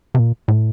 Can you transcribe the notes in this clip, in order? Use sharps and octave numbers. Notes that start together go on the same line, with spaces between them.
C3
A#2
A2